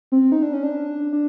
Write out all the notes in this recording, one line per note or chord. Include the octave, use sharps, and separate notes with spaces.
C4
D#4
D4
C#4
D4
D4